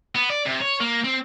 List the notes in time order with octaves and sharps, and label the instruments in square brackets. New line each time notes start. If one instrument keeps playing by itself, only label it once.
[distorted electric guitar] B3
D5
C3
C#5
A#3
C4